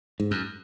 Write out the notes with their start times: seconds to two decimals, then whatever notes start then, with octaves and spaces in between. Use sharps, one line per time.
0.20 G#2
0.31 F#2